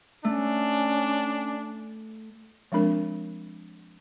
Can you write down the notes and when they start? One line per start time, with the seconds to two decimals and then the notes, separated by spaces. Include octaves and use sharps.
0.24 A3 C#4 D4
2.72 F3 G#3 C4 D4 A#4